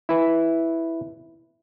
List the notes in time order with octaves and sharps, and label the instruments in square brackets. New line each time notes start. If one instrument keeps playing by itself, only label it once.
[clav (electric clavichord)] E4 B4